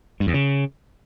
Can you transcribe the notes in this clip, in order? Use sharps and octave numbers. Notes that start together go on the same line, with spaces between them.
G2
E2
C#3